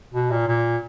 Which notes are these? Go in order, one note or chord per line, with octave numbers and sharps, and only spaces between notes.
B2
A#2
A#2